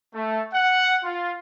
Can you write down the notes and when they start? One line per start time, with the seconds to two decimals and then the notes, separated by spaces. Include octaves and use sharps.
0.14 A3
0.54 F#5
1.04 F4